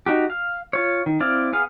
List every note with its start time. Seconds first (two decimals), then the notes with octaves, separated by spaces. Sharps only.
0.06 D#4 F#4 G4
0.30 F5
0.73 F4 C#5
1.06 D#3
1.20 C4 E4 D5 F5
1.53 B3 G#4 F5